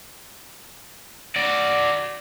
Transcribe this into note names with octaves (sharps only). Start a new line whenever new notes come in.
F#4 D5